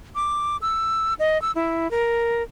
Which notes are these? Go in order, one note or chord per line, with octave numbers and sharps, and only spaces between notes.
D6
E6
D#5
E6
E4
A#4